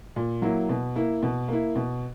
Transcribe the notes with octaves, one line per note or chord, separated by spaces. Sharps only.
A#2
F#3 A#3 E4
B2
A#3 E4
B2
A#3 E4
B2